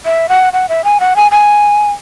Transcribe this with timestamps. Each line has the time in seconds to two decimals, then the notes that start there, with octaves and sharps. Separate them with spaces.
0.05 E5
0.29 F#5
0.53 F#5
0.69 E5
0.84 G#5
1.00 F#5
1.16 G#5
1.32 G#5